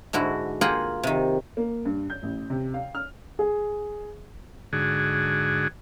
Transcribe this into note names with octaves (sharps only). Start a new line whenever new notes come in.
G#2 D3 E4 F#4
A#3 F4 G#4 F#5 G5
C3 D#3
A#3
G2
G6
A1
C3
F5
F6
G#4
G#2 D3 F#4 G#4